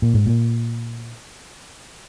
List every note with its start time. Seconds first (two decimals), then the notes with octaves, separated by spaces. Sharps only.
0.02 A#2
0.14 G#2
0.26 A#2